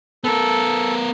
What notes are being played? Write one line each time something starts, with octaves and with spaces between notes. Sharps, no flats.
B3 A4 A#4